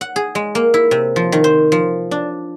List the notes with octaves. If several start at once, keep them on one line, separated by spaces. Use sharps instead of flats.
F#5
G#4
G#3
A#3
E4
C3
F3
D#3
C5
F3
D4